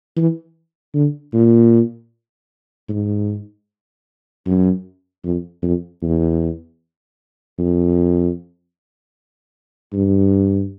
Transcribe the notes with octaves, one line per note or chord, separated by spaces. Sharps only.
E3
D3
A#2
G#2
F#2
F2
F2
E2
F2
G2